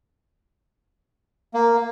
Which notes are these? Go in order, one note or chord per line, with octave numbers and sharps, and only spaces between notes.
A#3